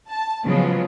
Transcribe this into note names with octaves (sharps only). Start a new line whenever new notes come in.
A5
C#3 F3 F#3 G#3 B3 C#4